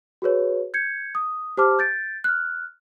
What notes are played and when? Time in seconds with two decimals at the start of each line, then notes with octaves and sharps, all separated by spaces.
0.22 F#4 G#4 B4 C#5
0.74 G6 G#6 C#7
1.15 D#6
1.57 G4 C5 A5 D6 F6
1.79 G6 A6 D7
2.24 F6 F#6